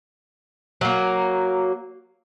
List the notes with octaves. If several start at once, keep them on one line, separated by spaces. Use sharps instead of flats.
F#3 A#3